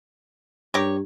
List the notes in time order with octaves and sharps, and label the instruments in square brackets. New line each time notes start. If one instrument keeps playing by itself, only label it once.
[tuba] G2 [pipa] G4 A#4 C#5